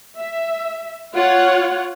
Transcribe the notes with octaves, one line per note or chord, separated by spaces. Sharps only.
E5
F4 C#5 F#5